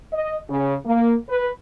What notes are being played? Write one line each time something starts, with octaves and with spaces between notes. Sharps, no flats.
D#5
C#3
A#3
B4